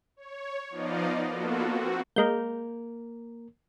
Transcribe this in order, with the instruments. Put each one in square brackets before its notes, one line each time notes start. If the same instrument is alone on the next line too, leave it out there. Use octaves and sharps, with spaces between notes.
[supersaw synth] C#5
F3 B3 D#4 D5 D#5 F5
A#3 B3 F4 F#4 A4
C4 F#4
[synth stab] G#3 G6 [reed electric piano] A#3 A#4